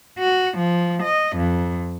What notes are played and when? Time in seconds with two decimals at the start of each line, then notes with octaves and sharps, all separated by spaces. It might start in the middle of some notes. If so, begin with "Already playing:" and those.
0.20 F#4
0.58 F3
1.03 D#5
1.36 F2